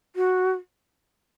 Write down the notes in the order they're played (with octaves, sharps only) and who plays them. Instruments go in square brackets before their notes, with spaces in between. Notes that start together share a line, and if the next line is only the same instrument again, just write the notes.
[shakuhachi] F#4